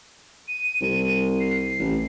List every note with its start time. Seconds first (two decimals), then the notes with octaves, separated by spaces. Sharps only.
0.48 D#7
0.81 C2
1.40 C7
1.80 A1